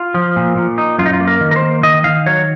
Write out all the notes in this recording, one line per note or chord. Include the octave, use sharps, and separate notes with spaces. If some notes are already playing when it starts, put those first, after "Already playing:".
Already playing: F4
F3
A#2
A#2
D#4
F#2 F4
D#4
F4
A#3
A#4
D#3
A#4
C5
A#3
D#3 D#5
D#3 F5
F#3 C#5